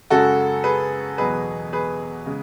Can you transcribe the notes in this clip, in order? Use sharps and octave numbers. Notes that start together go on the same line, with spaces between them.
F#2 C#3 G#3 F#4 A4
G#4 B4
E2 B2 F#3 G#4 B4
G#4 B4
C#3 G#3